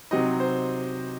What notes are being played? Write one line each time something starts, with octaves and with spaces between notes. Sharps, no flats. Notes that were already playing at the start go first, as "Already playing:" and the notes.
C3 F#3 C4 D#4 D#5
C5